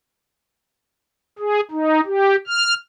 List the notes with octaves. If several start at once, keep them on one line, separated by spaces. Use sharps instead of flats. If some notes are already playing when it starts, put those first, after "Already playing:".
G#4
D#4
G4
F6